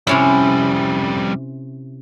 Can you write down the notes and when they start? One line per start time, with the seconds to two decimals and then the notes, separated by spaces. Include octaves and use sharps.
0.07 F2 C3 G3 C#4 E4